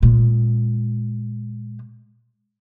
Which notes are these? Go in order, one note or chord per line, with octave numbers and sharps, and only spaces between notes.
A#2 G#3